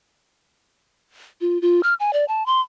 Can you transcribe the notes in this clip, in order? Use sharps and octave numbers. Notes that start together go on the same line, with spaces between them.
F4
F4
F6
G#5
D5
A5
C6